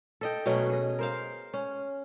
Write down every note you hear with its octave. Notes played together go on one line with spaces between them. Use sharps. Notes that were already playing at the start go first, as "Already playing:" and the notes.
A4 D#5 G5
B2 F#3 A3 C#4
G#4 D#5
A#4 C5 F5
C#4